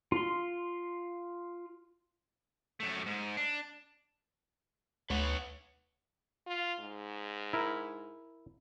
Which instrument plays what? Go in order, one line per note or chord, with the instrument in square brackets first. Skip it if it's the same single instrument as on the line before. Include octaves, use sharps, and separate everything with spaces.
[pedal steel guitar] F4 C6
[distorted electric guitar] F#2 A3
G#2
D4
[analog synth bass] D2 [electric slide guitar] B4 C#5 F#5
[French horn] F4
G#2
[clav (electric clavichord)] E4 A#4